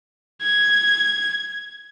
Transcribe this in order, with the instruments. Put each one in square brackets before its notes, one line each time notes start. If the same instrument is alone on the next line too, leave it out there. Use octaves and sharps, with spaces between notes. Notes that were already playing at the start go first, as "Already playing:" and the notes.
[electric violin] G#6